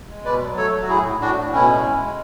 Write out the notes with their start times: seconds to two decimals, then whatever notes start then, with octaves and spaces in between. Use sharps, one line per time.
0.09 G#3
0.25 B2 B4 D5
0.41 F#3
0.57 A3 A4 C#5
0.73 F#3
0.82 F#4
0.88 A2 E4 G#4
1.04 A2
1.20 A2 D4 F#4
1.37 A2
1.52 B2 C#4 E4
1.69 G#3
1.85 G#3
2.01 G#3